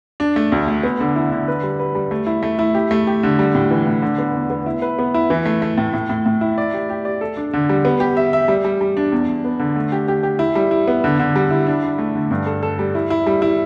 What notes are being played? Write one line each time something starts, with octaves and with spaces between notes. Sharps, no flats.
D4
A3
D2
A3
B3
D3
E4
D3
B4
G3
B4
G3
A3
E4
A3
E4
G4
A3
G4
D3
G3
A2
E3
A2
D3
B3
E2
B3
E4
B4
B3
E4
E3
A3
A3
A2
A2
A2
A2
E4
D5
G4
G4
D5
A4
D4
D3
G3
B3
G4
E5
E5
G3
G3
G3
D4
E2
E2
B3
D3
A3
G4
G4
G4
E4
G3
E4
B3
D3
D3
G3
E4
D4
D4
A3
D3
G2
A4
A4
G3
E4
E4
G3
E4